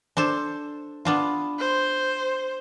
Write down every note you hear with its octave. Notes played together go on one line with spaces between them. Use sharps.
D4 A4 C5
B3 D4 F4
C5